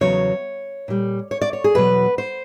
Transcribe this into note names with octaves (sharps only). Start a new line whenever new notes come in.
E2 C#3 F#3 C#5
A#2 G3
C#5
D5
C#5
G#4
E2 B2 F#3 B4
C5